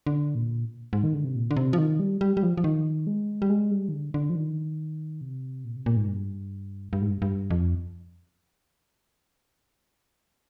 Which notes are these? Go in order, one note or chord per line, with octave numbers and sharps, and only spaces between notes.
D3
A#2
G#2
D#3
D3
C3
A#2
D3
C3
F3
D#3
G3
G3
G3
F3
F3
D#3
G#3
G3
G#3
G3
D#3
D3
D3
F3
D#3
C3
A#2
C3
A#2
G#2
G2
G2
G#2
G2
G2
F2